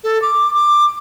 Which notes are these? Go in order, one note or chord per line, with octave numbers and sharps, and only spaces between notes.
A4
D6
D6